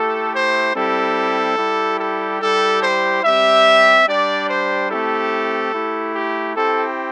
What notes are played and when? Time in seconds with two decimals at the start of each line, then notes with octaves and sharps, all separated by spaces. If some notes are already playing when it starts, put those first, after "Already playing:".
Already playing: A3 E4 G4 A4
0.32 C5
0.74 G3 C4 E4 G4 A4
1.57 G3 E4 G4
1.99 A4
2.40 G3 E4 G4 A4
2.82 C5
3.23 G3 C4 G4 E5
4.07 G3 D4 G4 D5
4.48 C5
4.89 A3 C4 E4 G4 A4
5.73 A3 E4 G4
6.14 G4
6.56 C4 E4 G4 A4